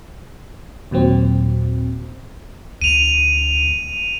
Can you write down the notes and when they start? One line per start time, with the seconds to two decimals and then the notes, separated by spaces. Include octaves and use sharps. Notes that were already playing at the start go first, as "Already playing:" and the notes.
0.91 D#2 A#2 F#3 C4
2.82 D2 D#7 F7